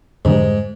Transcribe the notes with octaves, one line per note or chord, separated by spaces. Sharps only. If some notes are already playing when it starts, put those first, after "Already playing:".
F2 G#2 D3 G3